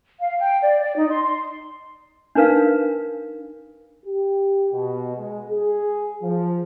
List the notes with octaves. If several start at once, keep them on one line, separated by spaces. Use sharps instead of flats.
F5
G5
D5
D5
D#4
C6
C6
D4 D#4 A#4 B4 F5
G4
B2
G#3
G#4
F3